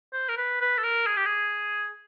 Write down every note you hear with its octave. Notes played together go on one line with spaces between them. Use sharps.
C5
A#4
B4
B4
A4
A#4
G#4
G4
G#4